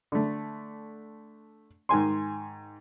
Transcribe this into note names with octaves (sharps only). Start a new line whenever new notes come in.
D3 A3
G#2 D#3 G#5 C6